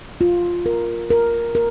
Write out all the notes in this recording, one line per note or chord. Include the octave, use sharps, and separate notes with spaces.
F4
A#4
A#4
A#4